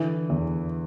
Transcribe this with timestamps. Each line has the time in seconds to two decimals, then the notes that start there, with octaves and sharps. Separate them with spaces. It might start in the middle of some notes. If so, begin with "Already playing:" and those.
Already playing: D3 E3
0.30 E2